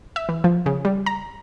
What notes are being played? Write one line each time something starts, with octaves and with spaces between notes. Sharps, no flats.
E5
E3
F3
C#3
G3
A#5